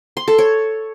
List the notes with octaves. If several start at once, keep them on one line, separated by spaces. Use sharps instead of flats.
C6
A4
C#5